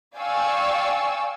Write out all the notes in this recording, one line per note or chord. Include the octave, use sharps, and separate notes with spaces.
D5 F5 G5 G#5 C#6 E6